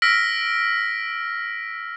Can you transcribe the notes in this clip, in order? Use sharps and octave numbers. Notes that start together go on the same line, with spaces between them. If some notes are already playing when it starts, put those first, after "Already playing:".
E6 F6 A#6 B6 D7